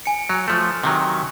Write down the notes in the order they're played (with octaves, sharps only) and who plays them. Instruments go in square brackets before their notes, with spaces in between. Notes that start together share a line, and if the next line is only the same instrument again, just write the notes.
[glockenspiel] G#5 C#7
[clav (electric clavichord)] F#3
F3 A3
C3 D#3 F#3